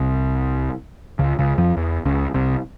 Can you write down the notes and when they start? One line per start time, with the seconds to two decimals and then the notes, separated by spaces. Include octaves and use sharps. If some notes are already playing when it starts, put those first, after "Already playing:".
Already playing: C2 C3
1.19 C#2 C#3
1.39 C#2 C#3
1.58 F2 F3
1.77 E2 E3
2.05 C#2 C#3
2.34 C2 C3